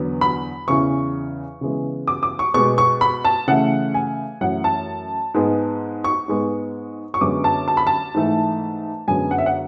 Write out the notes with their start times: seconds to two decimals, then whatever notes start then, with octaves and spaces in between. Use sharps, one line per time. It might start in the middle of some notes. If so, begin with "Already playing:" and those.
Already playing: E2 D3 F#3 B3
0.21 B5
0.68 E2 C#3 E3 C#6
1.61 C#3 E3 G#3 B3
2.07 D6
2.23 D6
2.39 C#6
2.54 B2 G#3 B3 C#6
2.78 C#6
3.01 B5
3.25 A5
3.47 C#3 E3 A3 F#5
3.94 G#5
4.41 F#2 E3 A3 F#5
4.64 A5
5.34 G#2 G#3 B3
6.04 C#6
6.28 G#2 G#3 B3
7.14 C#6
7.21 F#2 D3 G#3 B3 D6
7.44 A5
7.68 A5
7.77 B5
7.87 A5
8.14 G#2 E3 A3
9.08 F#2 D3 G#3 B3 G#5
9.31 F#5
9.38 E5
9.46 F#5